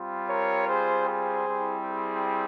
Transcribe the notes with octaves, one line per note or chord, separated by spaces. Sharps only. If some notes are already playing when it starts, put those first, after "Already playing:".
Already playing: G3 C4 F4
A#4 C#5
G#4 C5
G#4 C5
G3 C4 E4
G#4